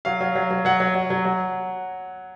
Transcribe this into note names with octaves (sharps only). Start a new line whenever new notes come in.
F#3 F5
F#3
F#3
F#3
F#3 F#5
F#3
F#3
F#3
F#3